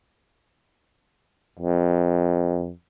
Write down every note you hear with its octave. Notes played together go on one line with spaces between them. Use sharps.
F2